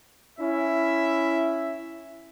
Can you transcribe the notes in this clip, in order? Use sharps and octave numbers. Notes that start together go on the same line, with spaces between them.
C#4 E4 E5